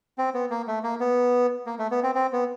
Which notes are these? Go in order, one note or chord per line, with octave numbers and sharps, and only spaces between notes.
C4
B3
A#3
A3
A#3
B3
A#3
A3
B3
C4
C4
B3